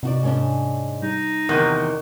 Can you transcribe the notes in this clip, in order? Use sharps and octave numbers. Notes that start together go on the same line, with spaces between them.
C3 D#4 F#4 D5
G#2 C#4 D4
G3 D#4
E2 C3 D#3 C#6